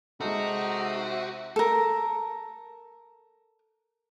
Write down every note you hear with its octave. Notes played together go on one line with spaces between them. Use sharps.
C3 G#3 D#4 F#4 A4 A#5
A4 A#4